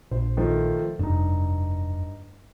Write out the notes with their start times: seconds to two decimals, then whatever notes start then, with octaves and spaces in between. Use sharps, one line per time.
0.11 A#1 C5
0.37 D#3 F3 A3
0.99 F1 G2 D#4